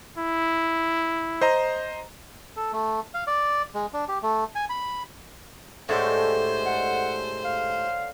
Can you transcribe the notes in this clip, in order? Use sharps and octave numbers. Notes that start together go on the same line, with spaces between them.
E4
C5 D#5 A#5
A4
A3
F5
D5
G#3
D4
G4
A3
G#5
B5
A2 D3 G#3 G4 A4 C5 C#5
F#5
F5